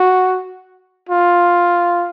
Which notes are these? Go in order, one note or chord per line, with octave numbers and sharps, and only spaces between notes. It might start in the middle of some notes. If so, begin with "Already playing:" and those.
Already playing: F#4
F4